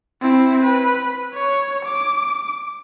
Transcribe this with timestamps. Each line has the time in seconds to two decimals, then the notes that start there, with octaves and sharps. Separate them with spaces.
0.22 C4 E4
0.64 B4
1.34 C#5
1.85 D6